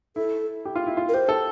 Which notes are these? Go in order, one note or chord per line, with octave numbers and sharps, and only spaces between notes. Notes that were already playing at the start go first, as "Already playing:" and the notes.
E4 A4
G4
F4
E4
F4
A#4
G4 C5
A4